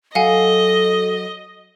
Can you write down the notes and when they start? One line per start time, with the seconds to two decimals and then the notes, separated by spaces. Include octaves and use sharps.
0.15 F#3 A4 D#5 F5 F#5 G#5